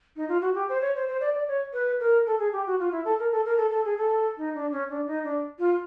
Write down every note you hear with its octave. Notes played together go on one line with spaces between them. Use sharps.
D#4
F4
F#4
G4
C5
C#5
C5
C5
D5
D5
C#5
B4
A#4
A4
G#4
G4
F#4
F4
E4
A4
A#4
A4
A#4
A4
A4
G#4
A4
D#4
D4
C#4
D4
D#4
D4
F4